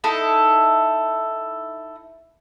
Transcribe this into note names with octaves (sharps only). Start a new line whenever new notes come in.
D#4 E4 A4